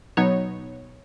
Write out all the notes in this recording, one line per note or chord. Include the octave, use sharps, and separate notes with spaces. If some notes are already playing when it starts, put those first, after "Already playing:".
B2 F#3 B3 D#4 C#5